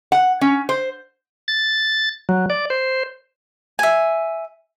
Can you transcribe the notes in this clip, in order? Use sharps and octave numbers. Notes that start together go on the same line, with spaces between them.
F#5
C#4
C5
A6
F#3
D5
C5
E5 G#5